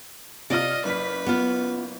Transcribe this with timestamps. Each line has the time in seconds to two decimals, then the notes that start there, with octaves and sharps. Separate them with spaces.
0.50 C3 F4 D5 D#5 F6
0.85 F#1 B4 B6
1.26 B3 F4